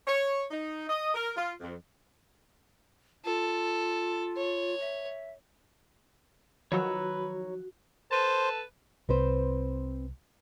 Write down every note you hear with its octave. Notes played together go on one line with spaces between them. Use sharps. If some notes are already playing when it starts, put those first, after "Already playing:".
C#5
D#4
D#5
A#4
F4
F2
F4 A4
C#5
E5
D#3 F3 F#3 F#4 B4 C#5 A#5 E6
A4 B4 C5 A5
C2 C4 B4 C5